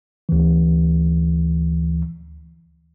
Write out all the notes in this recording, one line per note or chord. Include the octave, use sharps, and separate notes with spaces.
D2 E3